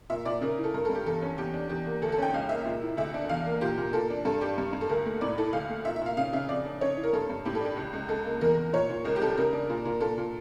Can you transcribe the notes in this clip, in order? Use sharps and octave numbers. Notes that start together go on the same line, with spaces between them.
A#2 E5
A#2 D5
C#3 A#4
E4
A4
G2 A#4
A4
G2
G4
E2 A4
C#4
E2 G4
D4
E2 G4
A#3
D2 A4
A4
C#4 G5
C#2 F5
A#3 E5
A#2
E4
D2 E5
D4
E2 F5
A#3
A#2 G4
A#2
A#2 A4
D4
G2 A4
D4 G4
G2
G2
A4
D2 A#4
A3
A2 D5
E4 A4
D2 F5
A3
A#2 E5
E5
A#2 F5
C#3 F5
C#3 E5
F2 D5
D4
C#3 C#5
E4
A#4
G2 A4
G2
A2 G4
A4
D4 G4
C#2
C#2
C#2 A4
A#3
E2 A#4
E2
A#2 C#5
A#2
C#2 A#4
G4
G3 A4
C#3 A#4
D4
A#2
A#2
A#2 A4
A#2